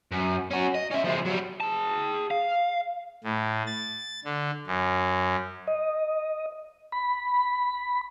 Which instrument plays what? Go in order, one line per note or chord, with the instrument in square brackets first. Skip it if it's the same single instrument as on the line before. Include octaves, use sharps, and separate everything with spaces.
[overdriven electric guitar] F#2
C#4 F#4
D#5
C#4 E5
F3 G#3
F#3 G3
[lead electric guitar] G#4 A5
F5
[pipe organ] A2
A6
D3
F#2
[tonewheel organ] D#5
B5